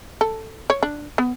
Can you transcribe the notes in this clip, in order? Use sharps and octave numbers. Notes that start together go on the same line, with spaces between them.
A4
C#5
D4
B3